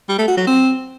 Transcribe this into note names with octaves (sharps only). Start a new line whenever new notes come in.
G3
A3
F#4
F#3
C4